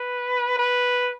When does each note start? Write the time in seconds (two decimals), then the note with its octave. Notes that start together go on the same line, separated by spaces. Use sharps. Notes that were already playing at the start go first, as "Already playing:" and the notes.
Already playing: B4
0.58 B4